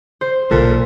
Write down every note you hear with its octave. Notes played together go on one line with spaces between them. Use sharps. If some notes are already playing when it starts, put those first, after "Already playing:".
C5
B1 A#2 A4